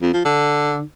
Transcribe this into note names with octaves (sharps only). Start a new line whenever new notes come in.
F2
F3
D3